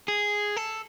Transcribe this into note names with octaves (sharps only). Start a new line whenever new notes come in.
G#4
A4